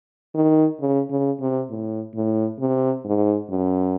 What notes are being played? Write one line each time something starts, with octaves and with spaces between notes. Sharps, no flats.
D#3
C#3
C#3
C3
A2
A2
C3
G#2
F#2